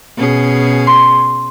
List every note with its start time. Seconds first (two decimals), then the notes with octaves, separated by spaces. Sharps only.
0.17 B2 C#4 G#4
0.87 C6